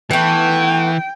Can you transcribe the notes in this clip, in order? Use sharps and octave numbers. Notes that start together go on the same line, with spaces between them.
E3 A3 B3 G5